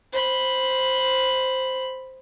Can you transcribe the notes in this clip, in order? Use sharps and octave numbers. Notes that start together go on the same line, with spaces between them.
C5 B5